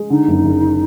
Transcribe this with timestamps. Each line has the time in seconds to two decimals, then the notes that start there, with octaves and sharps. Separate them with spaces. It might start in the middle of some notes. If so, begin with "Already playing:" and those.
Already playing: G#3
0.10 D3 D#4
0.28 F#1
0.45 F#1